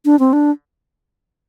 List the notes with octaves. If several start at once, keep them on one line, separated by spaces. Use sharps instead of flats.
D4
C4
D4